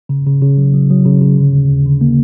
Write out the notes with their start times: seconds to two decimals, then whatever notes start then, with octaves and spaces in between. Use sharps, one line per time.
0.09 C#3
0.27 C#3
0.42 C#3
0.57 F#3
0.74 F#3
0.90 F#3
1.06 C#3
1.22 C#3
1.38 D3
1.53 D#2
1.69 D#2
1.86 D3
2.01 A#3